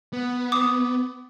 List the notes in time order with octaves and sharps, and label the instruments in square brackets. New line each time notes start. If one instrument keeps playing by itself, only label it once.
[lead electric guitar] B3
[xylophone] D6 D#6